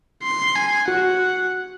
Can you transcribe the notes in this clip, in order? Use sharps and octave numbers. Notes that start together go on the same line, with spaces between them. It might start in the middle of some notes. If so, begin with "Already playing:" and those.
C6
G#5
F#4 F#5